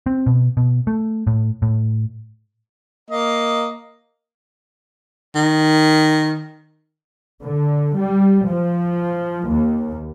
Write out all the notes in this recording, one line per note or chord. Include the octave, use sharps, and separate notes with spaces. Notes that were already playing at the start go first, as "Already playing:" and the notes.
C4
B2
B2
A3
A2
A2
A#3 D#5
D#3
D3
G3
F3
D#2